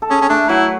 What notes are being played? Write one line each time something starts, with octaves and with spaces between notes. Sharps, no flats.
A4
C#4 G#4
C#4
A3 D4
F#3 E4